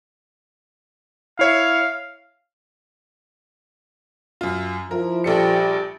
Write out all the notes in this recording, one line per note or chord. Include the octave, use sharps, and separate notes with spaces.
E4 C#5 E5 F5
F#2 F4
F3 E4 A#4
A#1 G3 G4 A4 D5 C#7